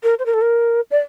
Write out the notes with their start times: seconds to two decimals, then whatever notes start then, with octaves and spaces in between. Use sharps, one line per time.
0.03 A#4
0.19 C5
0.26 A#4
0.34 A4
0.41 A#4
0.91 D5